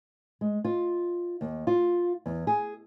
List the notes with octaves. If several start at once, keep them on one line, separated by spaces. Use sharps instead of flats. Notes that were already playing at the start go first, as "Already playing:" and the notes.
G#3
F4
D#2
F4
E2
G#4